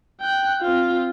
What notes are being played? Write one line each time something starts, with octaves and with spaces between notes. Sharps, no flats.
G5 F#6
C4 F4